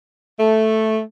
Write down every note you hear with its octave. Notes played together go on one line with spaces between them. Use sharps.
A3